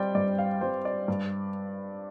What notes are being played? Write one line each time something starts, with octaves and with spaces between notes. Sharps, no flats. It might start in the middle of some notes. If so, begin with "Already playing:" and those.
Already playing: G3 C4 C5 D5 G5
G2 D5
F5
G3 C4 C5
D5
G2